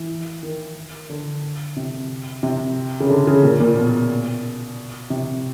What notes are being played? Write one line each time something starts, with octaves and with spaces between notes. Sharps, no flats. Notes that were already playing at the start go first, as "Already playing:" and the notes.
Already playing: E3
D#3
D3
C3
C3
C#3
D3
C#3
A#2
A#2
B2
C3